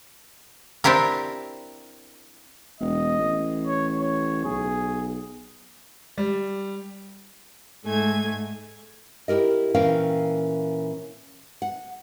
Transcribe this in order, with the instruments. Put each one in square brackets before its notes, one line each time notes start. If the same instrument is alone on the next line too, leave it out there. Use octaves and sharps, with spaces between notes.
[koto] C4 D4 E4 G4 A#4
[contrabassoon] E1 [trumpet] D#5
[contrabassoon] A1
[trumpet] C#5
C#5
[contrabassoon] B1 [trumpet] G#4
[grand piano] G3
[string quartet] G#2 A3 G#5 G#6
[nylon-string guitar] E4 G4 G#4 A#4 D#5
A#2 E3 C#4 A#4 F5 G5
F#5